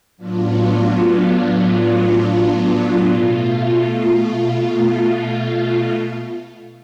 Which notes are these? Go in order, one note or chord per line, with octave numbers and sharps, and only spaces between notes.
A2 F#3 B3 D4 F4
B2 A3 F4